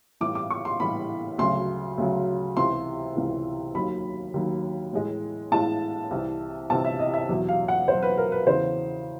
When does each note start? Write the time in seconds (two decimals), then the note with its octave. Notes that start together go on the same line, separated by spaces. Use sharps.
0.21 A2 E3 G3 D6
0.35 D6
0.50 C#6
0.65 C6
0.80 A2 E3 G3 B5
1.38 D2 C#3 F#3 C6
1.98 D2 C#3 F#3
2.57 C#2 C3 E3 C6
3.16 C#2 C3 E3
3.75 D#2 D#3 F#3 B5
4.34 D#2 D#3 F#3
4.93 A2 E3 G#3
5.52 A2 E3 G#3 A5
6.11 C2 C3 E3
6.70 C2 C3 E3 A5
6.85 E5
6.99 D#5
7.14 E5
7.29 E2 B2 F#3
7.49 F5
7.68 F#5
7.87 E2 B2 F#3 C5
8.02 B4
8.17 A#4
8.32 B4
8.47 E2 C#3 E3 C5